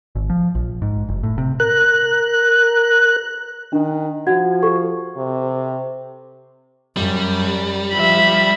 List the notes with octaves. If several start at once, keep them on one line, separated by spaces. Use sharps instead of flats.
G#1
F3
A#1
G#2
F#1
A2
C3
A#4 F#6
D#3 D4
F3 F#4 F#5 G#6
G4 A4 C#6
C3
F#2 G3
F3 E5 B5